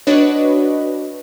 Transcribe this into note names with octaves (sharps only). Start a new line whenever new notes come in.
D4 F#4 B4 C#5 D#5